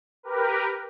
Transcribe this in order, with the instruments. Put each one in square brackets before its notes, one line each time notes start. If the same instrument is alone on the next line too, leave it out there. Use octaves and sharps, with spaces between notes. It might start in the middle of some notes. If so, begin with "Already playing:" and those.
[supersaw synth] G4 A#4 B4